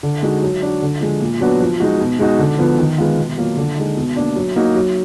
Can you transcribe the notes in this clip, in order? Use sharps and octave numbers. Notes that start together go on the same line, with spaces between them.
D3
G#3 D#4 F#4
F#3
D4 F#4
D3
F3 G#3
A#2
F#3 B3 D4 F#4
F3
G#3 D#4 F#4
B2
G#3 D#4 F#4
D3
F3 B3
D#3
G#3 B3 F4
B2
F#3 A#3 F4
D3
G#3 D#4
B2
A#3 D4
F#3
A#3 D#4 F#4
F#3